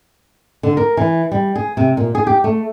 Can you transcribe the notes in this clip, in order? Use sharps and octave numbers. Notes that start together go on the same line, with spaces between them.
D3
A#4
E3
G3
G#4
C3
A#2
G#4
G4
A3